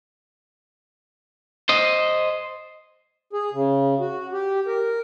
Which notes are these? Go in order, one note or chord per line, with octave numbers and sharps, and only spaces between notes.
C5 D#5
G#4
C#3
F#4
G4
A#4